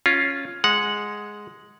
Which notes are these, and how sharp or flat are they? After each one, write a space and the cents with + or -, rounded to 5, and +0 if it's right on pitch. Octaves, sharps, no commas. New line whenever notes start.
C#4 +0 F4 +0
G#3 +0 F#5 -10